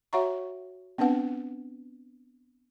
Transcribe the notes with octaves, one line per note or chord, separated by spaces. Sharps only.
F#4 C#5 E5 F#5 A#5 C#6
B3 C4 D4 B4 F#5